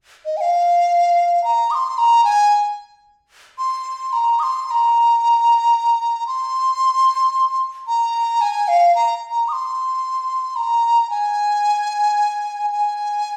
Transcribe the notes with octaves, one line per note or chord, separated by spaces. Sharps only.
D#5
G#5
F5
A#5
D#6
C6
A#5
G#5
C6
A#5
D#6
C6
C6
A#5
C6
A#5
G#5
F5
A#5
A#5
D#6
C6
A#5
G#5
G#5